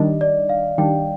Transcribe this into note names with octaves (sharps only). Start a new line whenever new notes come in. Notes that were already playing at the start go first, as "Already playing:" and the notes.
Already playing: D#3 G3 D4 D#5
D5
F5
D#3 G3 D4 G5